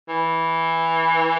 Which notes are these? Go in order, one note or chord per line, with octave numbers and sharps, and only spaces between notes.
E3